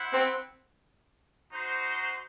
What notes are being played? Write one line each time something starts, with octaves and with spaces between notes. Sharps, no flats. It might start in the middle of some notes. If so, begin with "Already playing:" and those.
Already playing: E4 C5 F#5
C4
D#4 F#4 C5